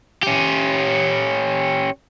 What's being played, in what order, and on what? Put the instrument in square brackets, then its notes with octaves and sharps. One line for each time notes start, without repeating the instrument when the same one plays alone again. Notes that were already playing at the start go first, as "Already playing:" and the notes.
[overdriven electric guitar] C#4 G4